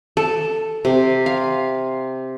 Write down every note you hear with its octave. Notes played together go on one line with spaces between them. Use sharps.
A4
C3
F5